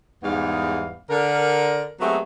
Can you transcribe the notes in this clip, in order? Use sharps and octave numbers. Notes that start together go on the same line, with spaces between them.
E2 G#2 E3 G3 B3 F5
D3 A#4
F#3 G#3 A3 B3 C4 G4